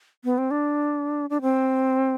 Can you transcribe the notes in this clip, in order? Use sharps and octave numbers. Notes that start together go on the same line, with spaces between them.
B3
C4
D4
D4
C4